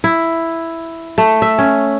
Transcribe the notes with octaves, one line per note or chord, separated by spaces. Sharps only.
E4
A3
E5
C#4